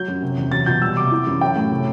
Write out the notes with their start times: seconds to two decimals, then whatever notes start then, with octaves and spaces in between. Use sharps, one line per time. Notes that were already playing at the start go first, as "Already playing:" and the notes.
Already playing: F#3 G6
0.08 F#2
0.22 C3
0.38 E2
0.52 F#3 A6
0.66 B2 G6
0.82 G3 E6
0.97 C3 D6
1.12 E3
1.27 F#2
1.41 F#3 G5
1.56 A2
1.71 C3